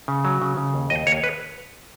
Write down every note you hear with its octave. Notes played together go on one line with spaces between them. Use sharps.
C#3
F#3
C#3
C#3
D#2
D#2 D#5
D#2 C#5
B4